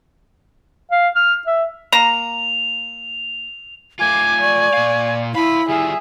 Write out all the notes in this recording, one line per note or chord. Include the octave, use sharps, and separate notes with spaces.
F5
F6
E5
A#3 A#5 F7
A3 F4 G#5 D6
D5 C#6
A#2 F5
E4 F5 A5 B5
G3 F4 G#4 E5